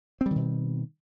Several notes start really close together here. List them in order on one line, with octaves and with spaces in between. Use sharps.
C4 G3 D#3 B2